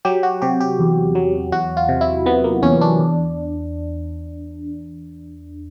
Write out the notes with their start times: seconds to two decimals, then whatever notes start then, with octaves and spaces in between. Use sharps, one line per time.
0.05 F#3 G4
0.23 F#4
0.42 C3 G4
0.60 G4
0.79 E2
1.15 F#3
1.52 E2 F#4
1.77 F4
1.89 C3
2.01 E4
2.26 C3 B3
2.44 A#3
2.63 E2 C#4
2.81 D4
2.99 E2